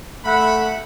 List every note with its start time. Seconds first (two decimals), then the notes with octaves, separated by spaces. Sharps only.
0.25 A3 E5 F#5 B5